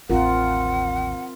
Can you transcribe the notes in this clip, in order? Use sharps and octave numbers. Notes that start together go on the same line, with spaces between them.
A1 D#2 C4 F4 A#4 F#5